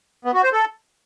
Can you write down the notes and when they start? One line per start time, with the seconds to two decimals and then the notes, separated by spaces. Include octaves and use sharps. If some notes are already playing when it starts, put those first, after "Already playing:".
0.25 B3
0.34 F#4
0.43 C5
0.53 A4